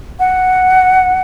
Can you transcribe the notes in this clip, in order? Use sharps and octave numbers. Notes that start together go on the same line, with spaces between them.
F#5